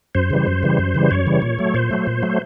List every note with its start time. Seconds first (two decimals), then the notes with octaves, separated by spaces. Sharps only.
0.15 F#2 C5
0.30 C#3 E3 G3
0.47 F#2
0.63 C#3 E3 G3
0.79 F#2
0.94 C#3 E3 G3
1.11 F#2 C#5
1.27 C#3 E3 G3
1.42 A#2
1.59 F#3 A3
1.74 A#2 C5
1.91 F#3 A3
2.07 A#2
2.23 F#3 A3